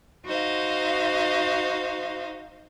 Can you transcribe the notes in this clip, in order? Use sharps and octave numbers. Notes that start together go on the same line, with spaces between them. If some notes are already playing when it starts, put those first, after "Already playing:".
D#4 F#4 C5 D#5 F5